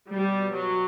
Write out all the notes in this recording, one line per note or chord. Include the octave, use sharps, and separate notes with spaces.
B2 G3
F#3